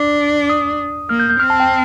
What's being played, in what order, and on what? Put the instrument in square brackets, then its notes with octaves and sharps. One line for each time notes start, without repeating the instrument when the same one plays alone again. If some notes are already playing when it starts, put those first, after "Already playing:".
Already playing: [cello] D4 [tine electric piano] D6
[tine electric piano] D#6
[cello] A#3 [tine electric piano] F6
[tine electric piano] G6
G6
[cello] C4 [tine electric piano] F6
[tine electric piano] A5
G5